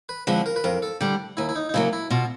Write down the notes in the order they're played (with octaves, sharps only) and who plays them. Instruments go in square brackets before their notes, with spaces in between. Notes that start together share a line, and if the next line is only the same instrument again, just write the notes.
[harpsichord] B4
[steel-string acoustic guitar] D3 F3 G#3 C4 [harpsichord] B4
[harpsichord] A#4
B4
[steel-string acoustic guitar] F2 [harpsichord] A#4
[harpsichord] A4
[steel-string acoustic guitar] D3 G3 [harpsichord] G4
[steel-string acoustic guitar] D#2 [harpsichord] E4
[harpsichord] E4
D#4
D#4
[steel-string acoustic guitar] C#3 F#3 A#3 [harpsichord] E4
[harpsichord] E4
[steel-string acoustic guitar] B2 [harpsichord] F4